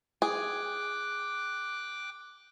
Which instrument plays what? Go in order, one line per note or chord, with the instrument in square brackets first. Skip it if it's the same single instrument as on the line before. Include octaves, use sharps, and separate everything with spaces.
[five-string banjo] G#4 [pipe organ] G5 D6 F#6